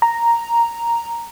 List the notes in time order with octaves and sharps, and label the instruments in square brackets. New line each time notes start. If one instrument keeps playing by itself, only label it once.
[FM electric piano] A#5